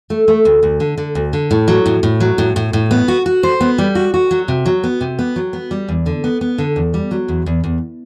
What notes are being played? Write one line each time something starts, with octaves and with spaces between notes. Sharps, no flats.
A3
A3
D2
D2
D3
D3
D2
D3
A2
F#3
A2
A2
F#3
A2
A2
A2
B3
F#4
F#4
C5
B3
G3
F#4
F#4
F#3
C3
F#3
B3
C3
B3
F#3
B3
G3
E2
D3
B3
B3
D3
E2
G3
F#3
E2
E2
E2